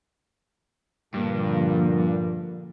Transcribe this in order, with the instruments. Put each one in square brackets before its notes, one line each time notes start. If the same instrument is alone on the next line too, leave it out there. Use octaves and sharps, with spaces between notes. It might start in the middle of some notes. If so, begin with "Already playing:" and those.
[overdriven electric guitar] G2 [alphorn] A#2 [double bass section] D3 F3 A#3